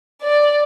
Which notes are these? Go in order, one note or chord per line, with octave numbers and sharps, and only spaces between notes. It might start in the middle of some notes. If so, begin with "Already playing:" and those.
D5